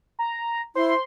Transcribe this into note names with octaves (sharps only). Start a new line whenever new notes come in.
A#5
E4 C5 C6